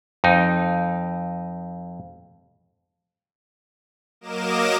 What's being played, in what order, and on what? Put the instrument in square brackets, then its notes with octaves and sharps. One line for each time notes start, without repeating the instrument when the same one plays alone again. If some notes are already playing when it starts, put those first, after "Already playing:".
[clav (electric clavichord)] F2 D#4
[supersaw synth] F#3 A#3 A#4 D#5 D6 E7